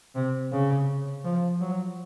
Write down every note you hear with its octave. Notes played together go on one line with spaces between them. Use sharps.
C3
C#3
F3
F#3